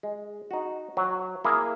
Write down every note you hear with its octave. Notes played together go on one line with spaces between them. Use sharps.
G#3
D#4 F#4
F#3
A#3 E4 G#4